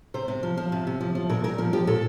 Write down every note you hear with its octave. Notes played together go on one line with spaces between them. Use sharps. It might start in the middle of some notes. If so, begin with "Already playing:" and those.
C3 C5
C3
F3
F3
C3
C3
F3
F3
A#2 A#4
A#2 A#4
F3 A#4
F3 G4
A#2 A4